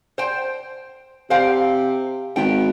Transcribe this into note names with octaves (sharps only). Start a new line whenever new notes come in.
C5 G5
C3 C5 F5 G5
G#1 B3 G5